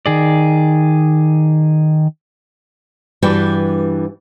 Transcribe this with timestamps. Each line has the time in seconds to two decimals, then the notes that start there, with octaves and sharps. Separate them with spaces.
0.06 D#3 G#4 D5
3.22 G2 E3 F#4 B4 D5 G5